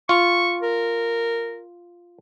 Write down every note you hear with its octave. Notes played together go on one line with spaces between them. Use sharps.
F4 C#6
A#4